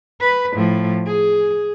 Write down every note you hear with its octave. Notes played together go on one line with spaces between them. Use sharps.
B4
A2 F3
G#4